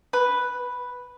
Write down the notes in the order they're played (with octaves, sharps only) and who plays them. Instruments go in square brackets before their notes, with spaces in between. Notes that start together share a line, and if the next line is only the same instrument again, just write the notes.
[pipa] B4